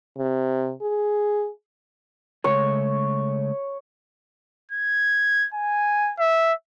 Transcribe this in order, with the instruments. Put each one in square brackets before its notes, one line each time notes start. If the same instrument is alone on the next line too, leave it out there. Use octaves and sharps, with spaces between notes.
[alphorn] C3
G#4
[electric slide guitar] C#3 G#3 A3 [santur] C#5
[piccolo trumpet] G#6
G#5
E5